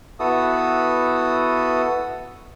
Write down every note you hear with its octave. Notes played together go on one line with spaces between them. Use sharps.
B3 E4 F#4 A4 D#6